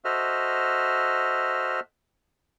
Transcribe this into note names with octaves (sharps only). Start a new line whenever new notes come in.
F#4 A4 C5 D#5 E5 F6